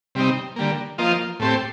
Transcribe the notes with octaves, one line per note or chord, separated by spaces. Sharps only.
C3 G3 C4 D#4
D3 G3 A#3
F3 A#3 F4 C5 D#5
A2 A3 C4 G4 C5